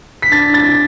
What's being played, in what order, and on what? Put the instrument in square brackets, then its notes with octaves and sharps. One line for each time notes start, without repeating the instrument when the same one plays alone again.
[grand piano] B6
[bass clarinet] D4 [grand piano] A6
[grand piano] A6